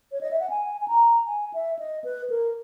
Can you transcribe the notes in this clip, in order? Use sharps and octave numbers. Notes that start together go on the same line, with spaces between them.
C#5
D#5
E5
F#5
G#5
G#5
A#5
G#5
E5
D#5
B4
A#4